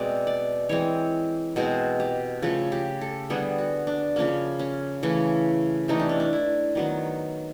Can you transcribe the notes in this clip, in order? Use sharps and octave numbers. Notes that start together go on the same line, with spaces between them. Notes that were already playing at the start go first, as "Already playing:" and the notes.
Already playing: B2 G#3 C4 D5
D5
E3 G#3 C4 C#5
B2 G#3 C4 C5
G4
C#3 F3 A3
G4
A4
D3 G3 B3 G#4
F#4
D4
C#3 F3 A#3 C#4
C#4
C#3 E3 A3
C3 E3 A3 D#4
D4
C#4
D4
E4
D#3 F#3 B3